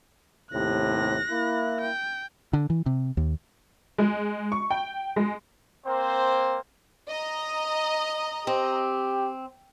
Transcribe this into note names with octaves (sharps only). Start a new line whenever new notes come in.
D#2 A2 C3 F#6 A#6
A#3 E4
G5
D3
E3
C3
D#2
G#3
C#6
G5
G#3
A#3 C4 C5
D#5 A#5
C4 G4